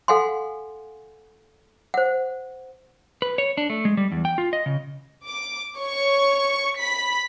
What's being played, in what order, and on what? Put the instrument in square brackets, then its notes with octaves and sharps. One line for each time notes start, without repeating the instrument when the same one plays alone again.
[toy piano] A4 F5 F#5 G#5 C6
C5 F#5
[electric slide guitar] B4
C#5
D4
A3
G#3
G3
E2
G5
F4
D#5
C#3
[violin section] D6
C#5 C#6
B5 B6